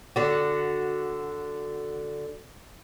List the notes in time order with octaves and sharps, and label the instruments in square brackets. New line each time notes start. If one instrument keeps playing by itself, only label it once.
[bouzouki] D3 F#4